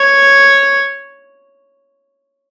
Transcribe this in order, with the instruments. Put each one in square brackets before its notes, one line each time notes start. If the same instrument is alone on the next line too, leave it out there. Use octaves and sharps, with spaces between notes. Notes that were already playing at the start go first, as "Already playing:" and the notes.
Already playing: [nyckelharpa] C#5